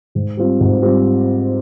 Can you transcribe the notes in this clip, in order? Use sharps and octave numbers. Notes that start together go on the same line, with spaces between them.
G#2
G3 C4 F4
G#2
G3 C4 F4